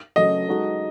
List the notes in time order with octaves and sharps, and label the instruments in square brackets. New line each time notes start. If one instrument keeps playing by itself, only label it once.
[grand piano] C#3 F#3 A3 [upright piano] D#5
[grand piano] G#3 D#4 F#4 A4